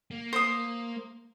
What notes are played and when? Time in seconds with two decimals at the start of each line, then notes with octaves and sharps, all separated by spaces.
0.11 A#3
0.33 C5 D#6